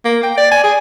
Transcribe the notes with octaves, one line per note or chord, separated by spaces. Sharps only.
A#3
G5
D5
G#5
G#4